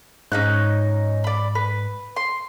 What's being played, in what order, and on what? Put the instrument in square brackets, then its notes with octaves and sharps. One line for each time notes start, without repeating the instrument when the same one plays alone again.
[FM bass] G#2 [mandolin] C#4 D#4 F#6
[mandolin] D5 B5
B4
C6